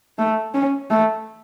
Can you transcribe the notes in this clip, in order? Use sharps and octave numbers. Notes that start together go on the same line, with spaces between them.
A3
C#4
A3